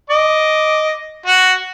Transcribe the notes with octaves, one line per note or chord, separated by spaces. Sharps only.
D#5 D6
F#4